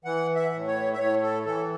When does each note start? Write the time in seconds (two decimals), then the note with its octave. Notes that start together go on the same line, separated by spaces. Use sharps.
0.05 E3 F#5
0.35 E5
0.52 A2
0.67 C#5
0.94 E5
0.98 A2 C#5
1.22 A4
1.46 E3 A4